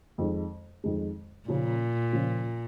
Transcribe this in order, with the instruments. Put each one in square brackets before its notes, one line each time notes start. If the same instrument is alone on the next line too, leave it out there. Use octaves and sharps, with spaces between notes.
[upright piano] F2 D#3 G#3
F2 D#3 G#3
[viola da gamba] A#2 [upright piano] C#3 F3 C#4 F4
[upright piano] C#3 F3 C#4 F4